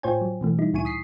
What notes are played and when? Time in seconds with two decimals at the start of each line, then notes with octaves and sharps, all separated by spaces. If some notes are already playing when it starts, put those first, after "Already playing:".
0.03 A2 F4 C5 C#5 G5 G#5
0.21 F#3
0.41 B2 E3 A3
0.58 G3 D#4 E4
0.73 D2 A#2 E4 G#5 C#6 D#7
0.85 D#6 B6 C7